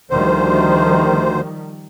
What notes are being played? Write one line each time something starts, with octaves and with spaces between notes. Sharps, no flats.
D2 D#3 F3 G3 C5